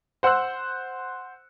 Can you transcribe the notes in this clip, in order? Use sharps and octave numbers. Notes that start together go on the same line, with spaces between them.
C5 F#5 C6 E6 F#6